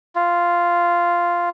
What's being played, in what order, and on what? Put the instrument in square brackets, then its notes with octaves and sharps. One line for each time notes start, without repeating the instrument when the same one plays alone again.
[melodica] F4